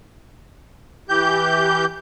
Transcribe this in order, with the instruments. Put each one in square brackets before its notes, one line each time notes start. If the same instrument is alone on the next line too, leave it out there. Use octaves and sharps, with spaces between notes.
[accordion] E3 G4 G6